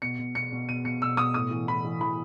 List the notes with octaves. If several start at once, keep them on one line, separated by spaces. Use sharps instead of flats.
B2 C#7
B2
B2 C#7
B2
B2 D#7
B2 C#7
B2 E6
B2 D#6
A2 D#6
E3
E3 B5
E3
E3 B5